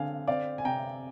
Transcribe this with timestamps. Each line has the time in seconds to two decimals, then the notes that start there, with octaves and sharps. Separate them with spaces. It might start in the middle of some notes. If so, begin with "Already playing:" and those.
Already playing: D3 C4 F5 G#5
0.27 C4 D5 F5
0.58 G#5
0.65 C3 G5 A#5